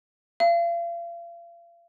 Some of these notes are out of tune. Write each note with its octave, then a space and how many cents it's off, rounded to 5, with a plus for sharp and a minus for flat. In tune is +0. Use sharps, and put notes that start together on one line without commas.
F5 -40